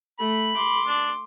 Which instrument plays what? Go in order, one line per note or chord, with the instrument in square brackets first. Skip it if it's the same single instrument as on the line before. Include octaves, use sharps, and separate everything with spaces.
[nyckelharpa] A3 [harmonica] B5
[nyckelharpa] C6 D6
[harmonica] D4